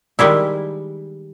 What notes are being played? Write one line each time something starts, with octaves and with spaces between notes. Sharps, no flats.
D#3 G3 G#3 E4